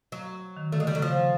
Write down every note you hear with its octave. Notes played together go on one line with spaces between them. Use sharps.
F#3
D#3
D3 A3
G#3
C#3 G3
F#3
C#3 F3